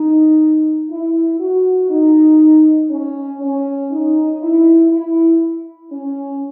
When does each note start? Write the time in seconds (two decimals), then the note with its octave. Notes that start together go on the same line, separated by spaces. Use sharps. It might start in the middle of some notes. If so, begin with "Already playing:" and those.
Already playing: D#4
0.90 E4
1.40 F#4
1.90 D#4
2.90 C#4
3.41 C#4
3.91 D#4
4.41 E4
4.91 E4
5.91 C#4